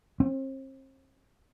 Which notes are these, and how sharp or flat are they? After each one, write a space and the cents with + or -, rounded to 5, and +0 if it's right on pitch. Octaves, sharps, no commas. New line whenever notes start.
C4 +40